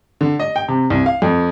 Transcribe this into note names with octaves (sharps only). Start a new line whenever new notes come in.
D3
D#5
G5
C3
C2
F5
F2